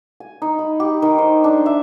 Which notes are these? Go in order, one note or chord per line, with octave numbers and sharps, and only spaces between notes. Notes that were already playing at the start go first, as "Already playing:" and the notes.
G#5
D#4
B5
G4
D#3
C5
D4
E5